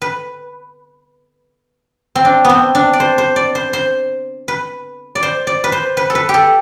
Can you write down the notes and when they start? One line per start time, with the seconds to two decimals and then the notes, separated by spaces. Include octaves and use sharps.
0.02 B4
2.15 C4
2.25 D4
2.45 B3 C4
2.75 D4
2.93 D5
3.00 C5
3.18 C5
3.36 D5
3.55 C5
3.73 C5
4.48 B4
5.15 D5
5.23 C5
5.47 D5
5.64 B4
5.72 C5
5.97 B4
6.10 A4
6.15 B4
6.29 G4
6.34 A4